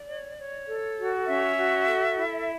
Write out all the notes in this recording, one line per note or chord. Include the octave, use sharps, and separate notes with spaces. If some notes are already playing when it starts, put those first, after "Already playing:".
Already playing: D5
C#5
C#5
A4
F#4
C#4 E5
F#4
A4
E4